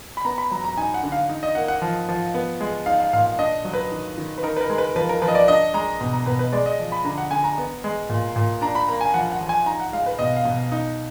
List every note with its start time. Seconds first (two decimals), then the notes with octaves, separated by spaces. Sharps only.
0.17 B5
0.25 B3 A#5
0.38 B5
0.51 F#3 A#5
0.64 A#5
0.77 D#4 G#5
0.94 F#5
1.03 D3
1.12 F5
1.29 D#4
1.43 D#5
1.55 A#3 F#5
1.68 F#5
1.82 F3
2.09 F3
2.34 B3
2.60 G#3
2.86 D#4 F5
3.00 F5
3.13 A#2 F5
3.26 F5
3.39 D4 D#5
3.65 F#3
3.74 B4
3.92 D#3
4.18 D#3
4.38 B4
4.43 D#4 A#4
4.57 B4
4.61 A#4
4.69 G#3
4.78 B4
4.96 F3 B4
5.09 A#4
5.22 F3 B4
5.28 D#5
5.35 D5
5.48 D4 D#5
5.74 G#3 A#5
6.01 B2
6.13 A#5
6.26 B2 B4
6.39 B4
6.53 G#3 D5
6.66 D#5
6.79 F3
6.92 B5
7.05 D3 A#5
7.18 F#5
7.31 D3 G#5
7.44 A#5
7.58 B3
7.84 G#3
8.09 A#2
8.36 A#2
8.61 D4 A#5
8.75 B5
8.88 A#3 A#5
9.01 G#5
9.14 F3 F#5
9.32 F#5
9.41 F3
9.49 G#5
9.66 D#4 A#5
9.80 F#5
9.92 G#3 F5
10.06 B4
10.19 B2 D#5
10.36 F5
10.45 B2
10.72 D#4